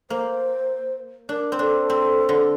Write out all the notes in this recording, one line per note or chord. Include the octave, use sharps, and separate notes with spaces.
A#3 C5
D4 A#4
C4
D4 A4
C4
D3